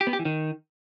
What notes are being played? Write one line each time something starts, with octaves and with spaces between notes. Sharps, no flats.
G4
B3
G4
E3
D#3